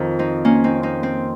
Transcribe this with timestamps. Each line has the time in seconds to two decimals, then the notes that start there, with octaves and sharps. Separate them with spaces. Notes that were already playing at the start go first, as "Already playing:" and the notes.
Already playing: F2 D#3
0.19 C4 D#4
0.45 A#3 C#4
0.64 C4 D#4
0.83 C4 D#4
1.03 C4